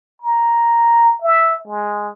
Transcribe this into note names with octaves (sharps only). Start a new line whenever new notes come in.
A#5
E5
G#3